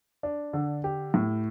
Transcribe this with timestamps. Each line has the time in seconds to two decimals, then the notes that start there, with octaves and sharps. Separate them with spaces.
0.23 D4
0.53 D3
0.84 G4
1.14 A2